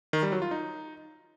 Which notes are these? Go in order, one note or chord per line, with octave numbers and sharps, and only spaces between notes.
D#3
G3
F#3
F4
D#4